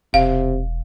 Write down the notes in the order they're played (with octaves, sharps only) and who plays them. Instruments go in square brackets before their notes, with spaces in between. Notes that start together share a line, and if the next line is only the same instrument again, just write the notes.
[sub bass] E1 [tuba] C3 [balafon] F5